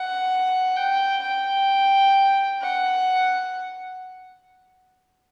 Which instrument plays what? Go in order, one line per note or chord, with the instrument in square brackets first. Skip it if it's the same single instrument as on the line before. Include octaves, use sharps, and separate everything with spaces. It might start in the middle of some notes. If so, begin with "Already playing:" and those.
Already playing: [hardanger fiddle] F#5
G5
G5
F#5